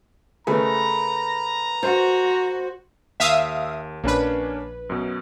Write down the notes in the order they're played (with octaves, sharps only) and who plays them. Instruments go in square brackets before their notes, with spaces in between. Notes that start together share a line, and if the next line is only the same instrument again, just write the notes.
[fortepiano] C#3 A3 [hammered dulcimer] B4 [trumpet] A#5
[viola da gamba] F#4 [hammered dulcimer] C5
[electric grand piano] D#2 [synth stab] E5 F5 D#6
[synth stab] A#1 B4 [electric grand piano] A#3 C#4 D4
[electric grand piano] F#2 B2